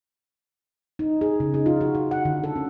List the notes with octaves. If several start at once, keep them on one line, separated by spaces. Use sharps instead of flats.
D#4
G#4
C#3
D#4
F4
F#4
F4
F#5
D3
A4
C#4